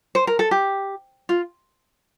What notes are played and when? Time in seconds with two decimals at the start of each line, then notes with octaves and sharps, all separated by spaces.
0.15 C5
0.27 A#4
0.39 A4
0.51 G4
1.29 F4